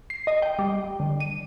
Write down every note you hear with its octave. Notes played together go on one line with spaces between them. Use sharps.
C7
D#5
G5
G3
D3
D#7